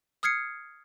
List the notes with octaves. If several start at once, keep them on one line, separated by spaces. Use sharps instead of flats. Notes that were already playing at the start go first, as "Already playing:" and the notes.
D#6 F6 G#6 C7 C#7